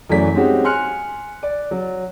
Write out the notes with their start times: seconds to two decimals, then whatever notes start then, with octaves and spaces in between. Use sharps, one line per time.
0.10 F#2 E3 F#3 A3 D5 B6
0.34 G#3 C4 C#4 D#4 F#4 G4
0.64 G#5 C6 F6 F#6 C#7
1.43 D5
1.71 F#3